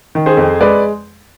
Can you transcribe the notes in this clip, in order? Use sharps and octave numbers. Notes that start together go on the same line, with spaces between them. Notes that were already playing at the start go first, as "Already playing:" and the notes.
D#3
G#4 C5
F2
G#3 B4 D5